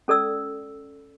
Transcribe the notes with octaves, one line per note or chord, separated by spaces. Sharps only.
C#4 A4 D5 E6